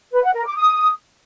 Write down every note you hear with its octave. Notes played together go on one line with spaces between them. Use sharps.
B4
F#5
A#4
D6
D#6